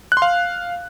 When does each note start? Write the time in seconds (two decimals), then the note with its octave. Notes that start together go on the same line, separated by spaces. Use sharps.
0.12 F#6
0.17 C6
0.22 F5